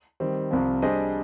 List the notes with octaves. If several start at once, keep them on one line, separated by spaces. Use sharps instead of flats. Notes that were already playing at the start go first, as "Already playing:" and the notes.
D#3 G3 C4
C2 C3 F3
G3 D4 G#4 C5 D#5